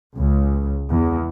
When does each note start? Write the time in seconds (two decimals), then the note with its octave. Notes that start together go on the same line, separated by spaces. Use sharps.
0.17 C#2
0.91 E2